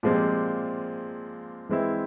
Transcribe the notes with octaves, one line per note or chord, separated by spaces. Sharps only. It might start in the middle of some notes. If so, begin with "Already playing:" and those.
A#2 F3 G#3 C4 G4
E3 G#3 C4 E4